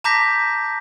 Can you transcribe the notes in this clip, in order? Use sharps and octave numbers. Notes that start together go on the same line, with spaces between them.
A5 A#5 D6 G6 A#6 B6